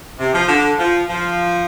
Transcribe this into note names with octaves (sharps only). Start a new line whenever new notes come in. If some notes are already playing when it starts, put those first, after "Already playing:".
C3
F3
D3
F3
F3